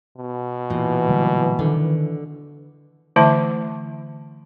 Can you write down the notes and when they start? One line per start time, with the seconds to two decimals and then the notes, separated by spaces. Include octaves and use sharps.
0.17 B2
0.70 A#2 E3
1.09 D3 F#3 G3
1.59 D3 D#3
3.16 D3 E3 A3 E4 E5 A5